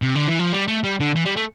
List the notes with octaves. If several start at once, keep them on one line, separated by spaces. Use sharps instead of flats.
C3
D3
E3
F3
G3
A3
G3
D3
E3
G3
A3